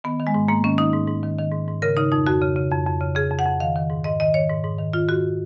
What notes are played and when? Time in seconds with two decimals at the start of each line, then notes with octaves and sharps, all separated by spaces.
0.04 D#3 B3
0.20 D#3
0.27 G#3
0.34 G#2
0.48 G#2 A#3
0.64 D#3 C#4
0.78 D#3 D#4
0.93 G#2
1.08 G#2
1.23 D#3
1.38 D#3
1.52 G#2
1.68 G#2
1.82 C#3 A#4
1.97 C#3 D#4
2.12 F2 D#4
2.27 F2 F#4
2.42 C#3
2.56 C#3
2.71 F2
2.86 F2
3.01 C#3
3.15 C#3 G#4
3.31 F2
3.39 F#5
3.46 F2
3.60 D#3 F5
3.76 D#3
3.90 G#2
4.04 G#2 D#5
4.20 D#3 D#5
4.34 D#3 C#5
4.50 G#2
4.64 G#2
4.79 D#3
4.93 D#3 F4
5.08 G#2 F#4